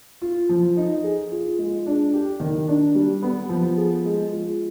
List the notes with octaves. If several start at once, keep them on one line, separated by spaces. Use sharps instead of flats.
F4
F3
D#4
G#4
F4
G#3
D4
G4
D#3
D4
G3
B3
F3
G#4
G#3
F4